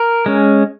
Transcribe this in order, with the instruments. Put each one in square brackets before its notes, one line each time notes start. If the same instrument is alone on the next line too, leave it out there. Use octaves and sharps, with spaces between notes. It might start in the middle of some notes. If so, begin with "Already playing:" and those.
Already playing: [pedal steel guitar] A#4
G#3 C#4